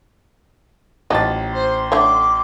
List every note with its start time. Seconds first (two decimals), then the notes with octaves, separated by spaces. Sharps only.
1.10 A1 F3 F#3 D#4 A6
1.54 C5 C6
1.92 D3 A3 C#5 D6